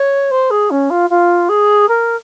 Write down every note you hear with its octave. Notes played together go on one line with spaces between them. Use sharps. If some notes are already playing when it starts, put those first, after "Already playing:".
Already playing: C#5
C5
G#4
C#4
F4
F4
G#4
A#4